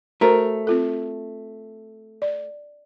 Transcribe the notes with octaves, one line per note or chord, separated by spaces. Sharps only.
A3 F#4 A#4 C5
C4 F4 A4
D5